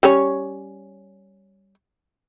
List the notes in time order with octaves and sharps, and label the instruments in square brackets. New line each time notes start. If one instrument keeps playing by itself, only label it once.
[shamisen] G3 C#4 C#5